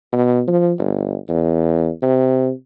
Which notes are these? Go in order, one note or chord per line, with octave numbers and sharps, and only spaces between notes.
B2
F3
G1
E2
C3